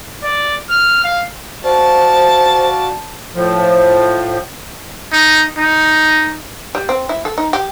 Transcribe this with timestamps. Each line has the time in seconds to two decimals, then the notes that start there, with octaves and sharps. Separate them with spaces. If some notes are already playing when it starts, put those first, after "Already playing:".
0.23 D5
0.70 F6
1.04 F5
1.64 F#4 C5 D5 F5 A5
3.35 A2 F3
5.13 D#4
5.58 D#4
6.75 G3
6.89 C4
7.09 E4
7.25 A4
7.38 D#4
7.53 G4